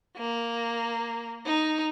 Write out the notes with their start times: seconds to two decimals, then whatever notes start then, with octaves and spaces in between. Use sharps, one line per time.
0.17 A#3
1.46 D#4